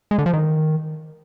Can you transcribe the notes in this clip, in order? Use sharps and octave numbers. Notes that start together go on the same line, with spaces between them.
G#3
D3
F3
D#3